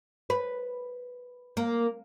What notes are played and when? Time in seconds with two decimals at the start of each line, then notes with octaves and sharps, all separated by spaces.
0.30 B4
1.57 A#3